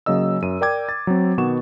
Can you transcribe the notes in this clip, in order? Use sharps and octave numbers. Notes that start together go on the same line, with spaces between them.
C#3 F#3 A#3 D#5 E6
F#2 D#7
A#4 D5 G5 D6 G#6
A6
F#3 C4
B2 D#3 B3 C#6 E7